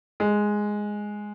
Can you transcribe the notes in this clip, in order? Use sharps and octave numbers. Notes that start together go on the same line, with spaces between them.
G#3